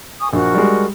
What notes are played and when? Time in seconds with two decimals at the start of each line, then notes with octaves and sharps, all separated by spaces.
0.21 G#5 C#6 D#6
0.33 A#1 F#4 A#4
0.55 G3 G#3